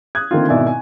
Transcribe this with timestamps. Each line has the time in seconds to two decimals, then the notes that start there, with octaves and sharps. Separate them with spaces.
0.15 D#6 F#6 G#6
0.31 D3 D#3 A3 A#3 C4 F4
0.49 G#1 B2 E4 A#4 D5 G#5
0.67 G#5